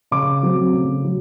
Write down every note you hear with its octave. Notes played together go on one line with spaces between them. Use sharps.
C#3 D6
F#3 A3 C4
C#3
F#3